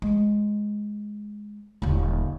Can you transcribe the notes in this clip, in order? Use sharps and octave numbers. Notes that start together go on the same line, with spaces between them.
G#3
D#1 D3